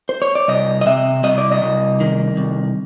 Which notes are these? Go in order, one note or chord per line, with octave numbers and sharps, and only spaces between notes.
C5
C#5
D5
C2 D#5
D#5
C3 E5
C2 D#5
D5
D#5
C2
D#3
C2